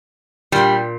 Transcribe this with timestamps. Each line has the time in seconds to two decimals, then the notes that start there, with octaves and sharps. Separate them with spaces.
0.52 A#2 G3